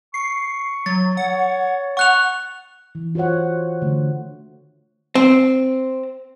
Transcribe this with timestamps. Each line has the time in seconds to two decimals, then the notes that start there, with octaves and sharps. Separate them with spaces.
0.14 C#6 C7
0.86 F#3 A6
1.17 C#5 F#5
1.97 F#5 C#6 F#6 F7
2.95 E3
3.15 F4 F#4 C5 C#5 F#5
3.82 D3 A3
5.15 C4